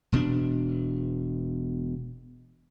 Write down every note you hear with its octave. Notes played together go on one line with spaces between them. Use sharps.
E1 B2 C4 D4